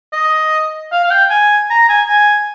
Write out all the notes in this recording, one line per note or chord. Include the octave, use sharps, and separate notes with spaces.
D#5
F5
F5
G5
G#5
A#5
G#5
G#5